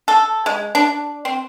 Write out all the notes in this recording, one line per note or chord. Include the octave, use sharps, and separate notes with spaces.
A4
G#3
D4
C4